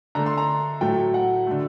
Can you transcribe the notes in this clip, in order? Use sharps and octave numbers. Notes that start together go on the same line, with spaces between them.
D3 A3 A#5
C6
A#5
A2 F#3 A3 G5
F#5
D3 A3